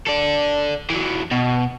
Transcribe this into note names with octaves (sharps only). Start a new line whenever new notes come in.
A4 D5
E3 F#3
B2